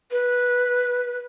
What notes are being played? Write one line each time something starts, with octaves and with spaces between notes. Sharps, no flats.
B4